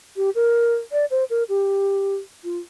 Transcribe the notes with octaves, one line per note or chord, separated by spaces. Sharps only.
G4
A#4
D5
C5
A#4
G4
F4